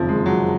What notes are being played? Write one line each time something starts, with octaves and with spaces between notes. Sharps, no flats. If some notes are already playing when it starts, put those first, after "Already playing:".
Already playing: F#1 F2 D#3 F3
G#3
F#3